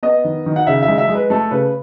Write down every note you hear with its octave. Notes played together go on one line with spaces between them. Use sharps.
B3 D#5
D#3
D#3
F#5
C#3 E5
E5
G#3
E5
G#3
B4
A3 A4
C#3 B4